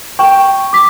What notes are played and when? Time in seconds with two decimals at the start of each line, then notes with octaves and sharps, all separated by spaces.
0.19 G5 C#6
0.73 D6 B6